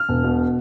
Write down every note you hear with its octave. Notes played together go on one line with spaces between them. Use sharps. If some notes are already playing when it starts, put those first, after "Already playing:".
Already playing: F6
E1
B2